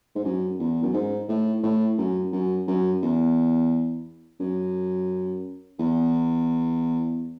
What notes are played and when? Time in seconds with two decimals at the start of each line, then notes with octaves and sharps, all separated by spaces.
0.15 G#2
0.25 F#2
0.59 E2
0.82 F#2
0.94 G#2
1.29 A2
1.63 A2
1.98 F#2
2.32 F#2
2.67 F#2
3.02 E2
4.40 F#2
5.79 E2